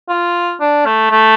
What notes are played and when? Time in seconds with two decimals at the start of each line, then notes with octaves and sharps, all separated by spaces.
0.09 F4
0.60 D4
0.86 A3
1.11 A3